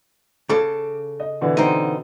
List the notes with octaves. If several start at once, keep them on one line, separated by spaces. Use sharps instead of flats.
C#3 A4 D6
D#5
B2 D3 E3
C4 D#4